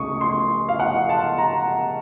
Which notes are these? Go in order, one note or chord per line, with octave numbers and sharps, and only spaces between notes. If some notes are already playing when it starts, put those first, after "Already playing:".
Already playing: C#2 C#3 A3 C#6 D#6
C6
F5
F#5
A5
A#5